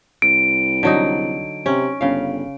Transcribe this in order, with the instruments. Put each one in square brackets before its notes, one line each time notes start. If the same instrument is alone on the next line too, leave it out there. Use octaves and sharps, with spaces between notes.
[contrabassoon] C2 [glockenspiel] D7
[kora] D3 F#3 D#4
[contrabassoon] C3 [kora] C#4
[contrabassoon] G1 [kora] C#3 F5